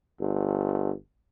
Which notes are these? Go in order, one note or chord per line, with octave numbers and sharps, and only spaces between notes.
G1